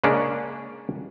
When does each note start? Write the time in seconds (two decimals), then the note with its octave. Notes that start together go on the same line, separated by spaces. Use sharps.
0.04 C#3 G#3 A#3 C#4 D4